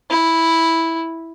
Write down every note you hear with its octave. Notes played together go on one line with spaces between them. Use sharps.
E4